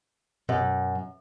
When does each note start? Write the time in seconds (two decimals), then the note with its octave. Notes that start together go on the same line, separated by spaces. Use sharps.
0.49 F#2 B2